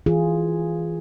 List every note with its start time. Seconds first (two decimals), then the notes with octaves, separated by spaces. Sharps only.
0.06 E3 F4 G#4